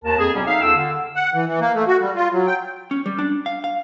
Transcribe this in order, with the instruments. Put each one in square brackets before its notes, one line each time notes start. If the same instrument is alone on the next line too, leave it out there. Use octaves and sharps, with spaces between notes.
[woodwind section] D#2 A#4 A5
F2 G#4
B2 F#3 G3 B3 C#4
D#4 E5 F5
E2 F4 A4 G5 E6
D3
[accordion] F#5
E3
E3
A#3
A3
F#4
G3
F4
F#3
G5
[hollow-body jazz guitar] C#4
G3
D4
F5
F5